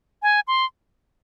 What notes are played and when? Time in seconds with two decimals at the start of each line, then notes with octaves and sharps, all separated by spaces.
0.23 G#5
0.48 C6